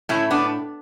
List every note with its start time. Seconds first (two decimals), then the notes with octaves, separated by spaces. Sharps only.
0.09 A2 C#4 E4
0.31 B3 D4